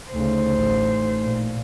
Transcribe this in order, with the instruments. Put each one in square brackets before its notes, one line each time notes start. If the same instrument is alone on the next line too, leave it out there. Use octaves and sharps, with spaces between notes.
[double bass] D2 C#3 [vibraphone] A3 D#4 [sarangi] C5
[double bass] A1
A#2